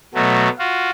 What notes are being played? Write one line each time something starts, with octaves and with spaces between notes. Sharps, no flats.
B2 F#3 A3
F4 F#4